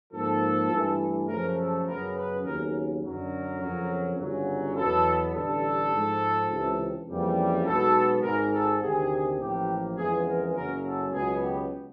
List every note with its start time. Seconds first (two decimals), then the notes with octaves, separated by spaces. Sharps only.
0.13 G#2 F3 A#3 A4
0.71 G2 E3 A3
1.29 F#2 C#3 F3 A3 A#4
1.58 A4
1.86 F#2 C#3 F#3 B3 A#4
2.15 B4
2.45 D#2 C#3 F#3 B3 A#4
3.03 F#2 D3 F#3 A#4
3.60 F2 C#3 F#3
4.18 G1 F#2 C#3 F#3
4.76 E2 B2 F#3 B3 A4
5.34 A1 G2 D3 A4
5.93 G#2 F3 G#3
6.50 C#2 C3 E3
7.08 F2 C#3 E3 G3 A#3
7.66 B1 B2 G#3 B3 A4
8.23 G#1 G#2 D#3 A#4
8.53 A4
8.81 D2 C3 D#3 G#4
9.40 A1 A2 F3 A#3 G4
9.97 F2 C#3 E3 G#3 B3 G#4
10.26 A#4
10.54 F#1 F#2 C#3 F#3 A#4
10.84 A4
11.12 C#2 B2 F#3 B3 G#4
11.42 G4